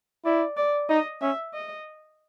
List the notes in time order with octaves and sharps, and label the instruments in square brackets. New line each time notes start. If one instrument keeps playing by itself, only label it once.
[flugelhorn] E4 [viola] D5
[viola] D5
[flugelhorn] D#4 [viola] D#5
[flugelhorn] C#4 [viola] E5
[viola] D#5